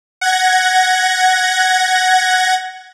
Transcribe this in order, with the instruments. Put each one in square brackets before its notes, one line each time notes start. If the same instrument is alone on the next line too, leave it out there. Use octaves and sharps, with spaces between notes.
[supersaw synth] F#5 G#6 A#6